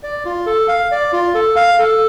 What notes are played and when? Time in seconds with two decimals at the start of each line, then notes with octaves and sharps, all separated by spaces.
0.03 D5
0.25 F4
0.46 A4
0.68 F5
0.91 D5
1.12 F4
1.34 A4
1.56 F5
1.79 A4